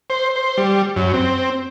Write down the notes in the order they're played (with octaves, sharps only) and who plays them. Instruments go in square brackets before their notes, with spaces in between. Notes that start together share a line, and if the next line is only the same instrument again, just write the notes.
[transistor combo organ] C5
C5
G3
F#2
C4